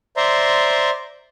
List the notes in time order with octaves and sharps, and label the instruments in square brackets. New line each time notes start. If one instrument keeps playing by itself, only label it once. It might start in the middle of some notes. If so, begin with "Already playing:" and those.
[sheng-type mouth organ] C5 D5 E5 A#5 C6